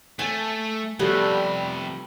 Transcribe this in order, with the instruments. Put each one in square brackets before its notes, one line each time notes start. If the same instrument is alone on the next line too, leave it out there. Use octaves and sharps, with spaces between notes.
[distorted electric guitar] A3 [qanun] G#5 A5
[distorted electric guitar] C3 F3 [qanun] G3 A3 B3